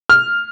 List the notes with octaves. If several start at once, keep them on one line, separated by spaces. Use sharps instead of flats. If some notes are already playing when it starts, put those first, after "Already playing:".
F6